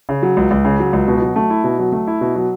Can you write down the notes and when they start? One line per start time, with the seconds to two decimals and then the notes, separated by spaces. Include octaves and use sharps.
0.09 C#3
0.22 F#3
0.37 C#2
0.51 C#2
0.65 C#3
0.80 F#3
0.93 C#2
1.08 B2
1.22 F#3
1.36 A3
1.50 E4
1.64 B2
1.79 F#3
1.92 A3
2.07 E4
2.21 B2
2.36 F#3